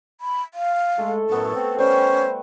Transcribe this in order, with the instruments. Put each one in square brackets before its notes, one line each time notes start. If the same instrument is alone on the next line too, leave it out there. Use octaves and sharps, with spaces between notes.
[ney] B5
F5
[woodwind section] G#3 [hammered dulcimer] A3 A4
[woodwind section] F#2 A2 F#3 [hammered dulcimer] A3 B3 C#5 [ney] A4
[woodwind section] C4
[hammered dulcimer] G3 [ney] C#4 [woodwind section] C5